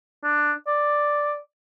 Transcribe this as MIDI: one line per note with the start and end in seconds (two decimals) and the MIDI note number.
0.24 0.52 62
0.67 1.38 74